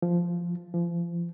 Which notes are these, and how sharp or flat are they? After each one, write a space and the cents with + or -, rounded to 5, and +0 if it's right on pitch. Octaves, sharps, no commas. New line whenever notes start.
F3 -5
F3 -30